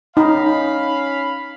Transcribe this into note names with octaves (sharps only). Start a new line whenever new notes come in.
C#4 D#4 F5 B5